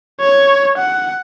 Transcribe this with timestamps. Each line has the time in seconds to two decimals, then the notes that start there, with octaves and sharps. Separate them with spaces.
0.20 C#5
0.78 F#5